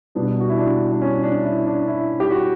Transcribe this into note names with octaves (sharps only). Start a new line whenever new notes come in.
B2 G3 B3 D4
F#4
E4
D4
D4
C#4
D4
E4
D4
E4
G4
F#4